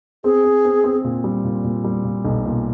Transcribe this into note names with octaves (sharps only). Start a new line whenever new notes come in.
C4 G#4
C4
C4
C4
A#2
G3
A#2
A#2
G3
A#2
B1
A#2